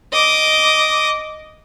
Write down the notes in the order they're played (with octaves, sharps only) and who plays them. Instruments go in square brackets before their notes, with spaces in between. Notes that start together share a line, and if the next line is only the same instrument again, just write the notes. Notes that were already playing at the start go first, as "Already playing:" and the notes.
[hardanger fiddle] D#5 D6